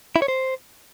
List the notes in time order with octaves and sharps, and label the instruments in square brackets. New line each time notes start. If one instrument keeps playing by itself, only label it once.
[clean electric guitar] E4
C#5
C5